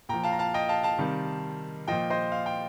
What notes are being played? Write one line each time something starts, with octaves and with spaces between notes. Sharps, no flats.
A#2 F3 G5 A#5
F5 A5
A#5
F5 A5
D#5 G5
F5 A5
F5 A5
C3 D#3 G3
A#2 F3 D#5 G5
C5 D#5
F5
G5